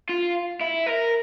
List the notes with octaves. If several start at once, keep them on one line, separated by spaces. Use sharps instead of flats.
F4
E4
A#4